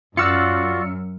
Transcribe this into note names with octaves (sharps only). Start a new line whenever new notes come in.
F#2 F4 F#4 D5 E6 F6 C#7